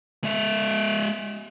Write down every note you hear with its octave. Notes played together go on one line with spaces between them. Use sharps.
G#3 E5